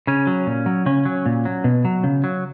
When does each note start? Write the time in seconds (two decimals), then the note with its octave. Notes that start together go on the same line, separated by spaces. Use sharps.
0.07 C#3 C#4
0.27 F#3
0.47 A#2
0.66 F#3
0.86 C#3 C#4
1.05 F#3
1.26 A#2
1.45 F#3
1.64 B2
1.85 F#3
2.04 C#3
2.24 F#3